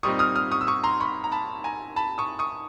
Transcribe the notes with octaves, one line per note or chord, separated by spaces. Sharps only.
A#2 G3 C4 D#4 C#6 D#6
D#6 F6
D#6 F6
C#6 D#6
E6
C#6 D#6
A#5 C6
B5 C#6
A#5
A5 B5
G#5 A#5
A5 B5
C#6 D#6
C#6 D#6